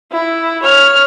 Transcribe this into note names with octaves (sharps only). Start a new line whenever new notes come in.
E4
C#5 F6